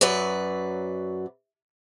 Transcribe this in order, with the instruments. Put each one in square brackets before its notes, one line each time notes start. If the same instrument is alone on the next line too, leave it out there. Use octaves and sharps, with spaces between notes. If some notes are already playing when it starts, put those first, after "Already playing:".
[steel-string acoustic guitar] F#2 F#3 B4 D5